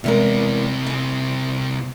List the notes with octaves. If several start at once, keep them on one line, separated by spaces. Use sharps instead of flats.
E2 C3 G#3 E4 A#4
C4 G#5